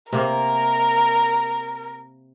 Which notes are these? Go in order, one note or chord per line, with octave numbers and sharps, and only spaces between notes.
C3 A#3 A#4